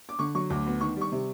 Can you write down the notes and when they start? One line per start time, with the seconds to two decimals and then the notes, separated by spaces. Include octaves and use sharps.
0.09 D6
0.19 D3 C#6
0.35 F#3 C#6
0.50 D2 D6
0.66 B3
0.81 D#3 C#6
0.96 G3
1.01 C#6
1.12 C3